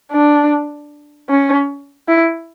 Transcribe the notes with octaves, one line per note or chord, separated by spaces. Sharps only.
D4
C#4
E4